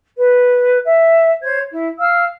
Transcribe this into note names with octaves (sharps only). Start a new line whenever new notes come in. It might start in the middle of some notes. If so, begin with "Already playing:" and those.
B4
E5
C5 C#5 G#6
E4
F5 E6 F6